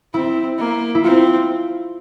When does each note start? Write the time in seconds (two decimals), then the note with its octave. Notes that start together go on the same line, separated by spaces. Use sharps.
0.14 C4 E4
0.59 A#3
0.95 E4
1.04 C4 F4